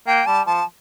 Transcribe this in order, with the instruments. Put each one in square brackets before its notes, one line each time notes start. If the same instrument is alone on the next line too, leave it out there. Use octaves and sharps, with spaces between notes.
[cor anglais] A#3 [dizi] G5
[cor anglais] G3 [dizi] A5
[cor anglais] F3 [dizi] A5